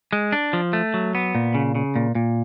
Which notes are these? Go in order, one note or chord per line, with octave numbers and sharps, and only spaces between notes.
G#3
D4
F3
A3
F#3
B3
A#2
C#3
C#3
A#2
A#2